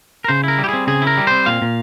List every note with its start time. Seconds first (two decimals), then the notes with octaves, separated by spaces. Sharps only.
0.24 A#4
0.28 C#3 C5
0.44 E4 A#4
0.58 G3
0.64 G4
0.69 C4 G#4
0.87 C#3 G#4
1.02 E4 A#4
1.17 G3
1.27 C4 C5
1.46 A#2 F5
1.62 A#2